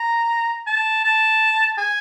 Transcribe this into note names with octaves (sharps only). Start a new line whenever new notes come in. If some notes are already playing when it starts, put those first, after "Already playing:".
Already playing: A#5
A5
A5
G#5